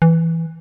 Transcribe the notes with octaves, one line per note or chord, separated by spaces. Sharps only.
E3